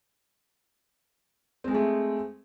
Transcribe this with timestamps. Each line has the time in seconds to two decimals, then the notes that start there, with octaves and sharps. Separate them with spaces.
1.64 C4
1.68 G#3
1.71 G#4
1.74 A3